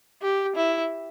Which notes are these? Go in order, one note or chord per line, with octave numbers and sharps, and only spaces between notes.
G4
E4